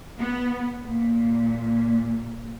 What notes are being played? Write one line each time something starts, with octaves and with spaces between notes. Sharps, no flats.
B3
A#2